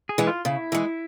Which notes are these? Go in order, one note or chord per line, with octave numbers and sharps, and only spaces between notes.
G#4
E3 G#3
F4
C#3 E4
E3 G#3